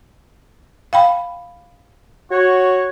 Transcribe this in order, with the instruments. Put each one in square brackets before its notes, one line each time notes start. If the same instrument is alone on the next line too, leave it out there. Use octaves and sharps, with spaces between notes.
[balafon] F5 G5 B5
[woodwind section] F#4 C#5